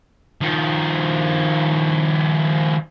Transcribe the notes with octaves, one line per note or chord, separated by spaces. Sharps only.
D#3 F3